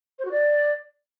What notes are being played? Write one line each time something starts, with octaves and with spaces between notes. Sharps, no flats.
C5
F#4
D5